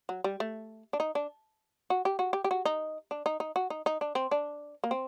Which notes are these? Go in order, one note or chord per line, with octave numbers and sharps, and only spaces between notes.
F#3
G3
A3
D4
D#4
D4
F#4
G4
F#4
G4
G4
F#4
D#4
D4
D#4
D#4
F#4
D#4
D#4
D4
C4
D4
A#3
C4